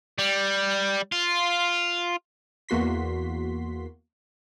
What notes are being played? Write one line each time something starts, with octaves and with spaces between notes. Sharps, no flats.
G3
F4
E2 A#3 F#4 C6 B6